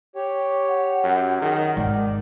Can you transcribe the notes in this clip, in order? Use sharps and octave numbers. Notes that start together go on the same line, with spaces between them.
G4 C#5 G5
F#5
F#2
D#3 G#4
G#1 D5